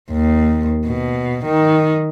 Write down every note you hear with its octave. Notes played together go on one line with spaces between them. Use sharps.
D#2
B2
D#3